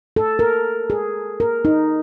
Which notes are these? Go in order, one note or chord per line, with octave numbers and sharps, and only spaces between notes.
A4
A#4
G#4
A#4
D#4